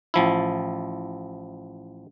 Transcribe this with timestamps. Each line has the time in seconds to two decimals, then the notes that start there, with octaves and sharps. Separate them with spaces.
0.14 A1 F3 E4